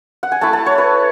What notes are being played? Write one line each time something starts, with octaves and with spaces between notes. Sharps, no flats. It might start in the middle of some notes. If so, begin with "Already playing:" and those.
F#5
G#5
A3 E4 A5
A5
C#5
B4